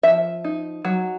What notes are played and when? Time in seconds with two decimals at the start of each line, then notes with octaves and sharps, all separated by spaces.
0.03 F3 E5
0.44 D#4
0.85 F#3